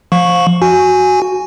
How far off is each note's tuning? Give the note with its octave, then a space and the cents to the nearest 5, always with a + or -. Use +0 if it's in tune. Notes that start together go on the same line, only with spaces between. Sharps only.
F3 +0 F5 +30 C#6 -5
F#4 +0 G#5 +0